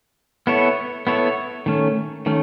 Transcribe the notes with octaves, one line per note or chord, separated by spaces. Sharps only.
B3 E4 A4 C#5
B3 E4 A4 C#5
D#3 A3 C#4
D#3 A3 C#4